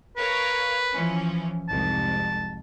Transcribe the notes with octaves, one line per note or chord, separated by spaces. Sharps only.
A#4 B4 C#5 F5
E3 F3 C#4
C2 F2 G#2 A5